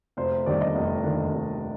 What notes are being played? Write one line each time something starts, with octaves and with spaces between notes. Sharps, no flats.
F1 C5
C5
D#2 D#3 G3 D4 D5
D#5
F1
D#2 D#3 G3 D4
F1